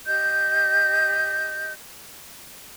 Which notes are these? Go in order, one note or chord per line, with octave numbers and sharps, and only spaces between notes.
G4 D#5 G6